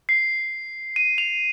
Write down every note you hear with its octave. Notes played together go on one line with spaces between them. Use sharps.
C7
D#7
F7